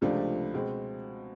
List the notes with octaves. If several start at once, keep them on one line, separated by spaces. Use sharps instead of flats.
C#2 C3 F3 A3 D4
B2 G#3 C4